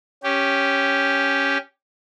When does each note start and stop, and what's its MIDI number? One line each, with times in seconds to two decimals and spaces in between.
0.24 1.58 61
0.24 1.58 67